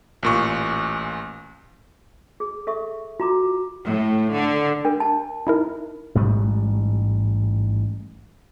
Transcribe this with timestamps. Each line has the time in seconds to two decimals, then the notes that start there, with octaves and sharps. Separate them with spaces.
0.23 A1 A#2 C#6
2.40 G#4
2.67 A4 E5 C#6
3.20 F4 F#4 A#5 D6
3.86 A2
4.33 D3
4.85 D4 A#4
5.00 A5
5.47 D#4 E4 A#4
6.15 A1 G#2 G3